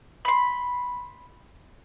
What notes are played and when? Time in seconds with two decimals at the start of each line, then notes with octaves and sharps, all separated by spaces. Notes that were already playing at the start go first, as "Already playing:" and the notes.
0.25 B5 C6